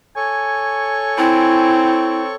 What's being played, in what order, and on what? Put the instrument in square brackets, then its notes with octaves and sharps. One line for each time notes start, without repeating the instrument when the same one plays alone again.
[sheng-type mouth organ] A4 C#5 C#6 [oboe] G#5
[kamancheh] C4 [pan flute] E4